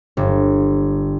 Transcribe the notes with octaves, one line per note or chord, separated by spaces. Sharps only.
G1